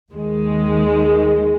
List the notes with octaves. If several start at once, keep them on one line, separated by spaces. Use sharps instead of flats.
D#2 D#3 G#3